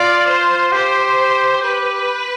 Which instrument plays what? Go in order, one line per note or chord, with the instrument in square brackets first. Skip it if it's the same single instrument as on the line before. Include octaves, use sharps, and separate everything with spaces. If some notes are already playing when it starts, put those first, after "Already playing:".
Already playing: [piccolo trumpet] F4 [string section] D5
[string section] C5
[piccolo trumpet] G4 [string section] C5
[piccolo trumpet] G4 [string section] B4